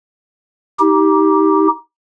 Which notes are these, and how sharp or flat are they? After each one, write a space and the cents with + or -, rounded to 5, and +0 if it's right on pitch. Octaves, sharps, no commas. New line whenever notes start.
D#4 +30 G4 +0